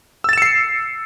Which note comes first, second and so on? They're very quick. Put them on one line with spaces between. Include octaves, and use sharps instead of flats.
E6 A6 E7 C#7 C7